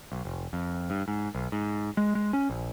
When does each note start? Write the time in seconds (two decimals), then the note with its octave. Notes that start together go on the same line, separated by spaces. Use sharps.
0.12 B1
0.25 F1
0.53 F2
0.90 G2
1.08 G#2
1.35 B1
1.52 G#2
1.97 G#3
2.15 G#3
2.33 C#4
2.50 A#1